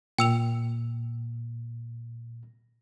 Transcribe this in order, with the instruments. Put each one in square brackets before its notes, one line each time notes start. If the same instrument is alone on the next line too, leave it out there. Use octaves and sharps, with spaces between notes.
[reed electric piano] A#2 [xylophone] G5 E6 F7